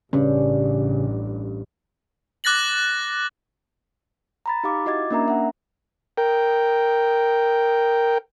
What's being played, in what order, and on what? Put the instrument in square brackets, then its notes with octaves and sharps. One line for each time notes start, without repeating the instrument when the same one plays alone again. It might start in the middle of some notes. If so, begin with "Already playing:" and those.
[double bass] A1 [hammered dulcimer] G2 [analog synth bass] C#3 [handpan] C#4
[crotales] D6 F#6 A6 A#6 F#7
[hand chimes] A#5 B5 A6
D#4 G4 F5 D6
E4 F#4 D#5 D6 G#6 A6
A#3 C#4 D4 A#4 E5 A#5
E5 F#5
[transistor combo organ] A#4 G5